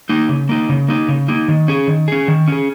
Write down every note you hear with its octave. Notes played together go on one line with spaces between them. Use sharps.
A#3 D#4
C#3
A#3 D#4
C#3
A#3 D#4
C#3
A#3 D#4
D#3
C#4 G#4
D#3
C#4 G#4
D#3
C#4 G#4